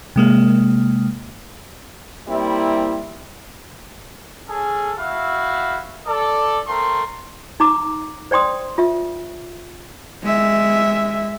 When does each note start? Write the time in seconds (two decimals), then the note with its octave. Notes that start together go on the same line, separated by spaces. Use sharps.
0.16 C3 G#3 A#3
2.28 G3 A#3 C4 E4
4.49 C#4 G#4 A4
4.98 E4 F#4 E5 F5
6.07 A4 D5
6.68 A3 C4 A#4 C6
7.60 D#4 A#5 D6
8.31 C5 D5 G5 C6 D#6
8.78 F4 E5
10.23 G#3 E5